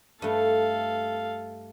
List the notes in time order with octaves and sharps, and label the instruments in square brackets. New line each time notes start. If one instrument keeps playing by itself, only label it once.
[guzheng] G2 A3 [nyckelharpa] A4 F5